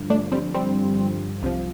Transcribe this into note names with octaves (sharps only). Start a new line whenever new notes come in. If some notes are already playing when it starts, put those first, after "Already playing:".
Already playing: G2 D3 F3
A3 D4
G3 C4
G3 C4
C2 C3 F3